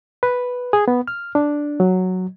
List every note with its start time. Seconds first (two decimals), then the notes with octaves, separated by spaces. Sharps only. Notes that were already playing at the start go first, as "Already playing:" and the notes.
0.23 B4
0.73 G#4
0.88 B3
1.08 F6
1.35 D4
1.80 F#3